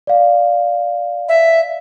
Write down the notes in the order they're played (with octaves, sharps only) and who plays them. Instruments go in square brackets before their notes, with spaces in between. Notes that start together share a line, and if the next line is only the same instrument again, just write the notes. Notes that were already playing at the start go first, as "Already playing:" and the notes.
[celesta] D5 F5
[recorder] E5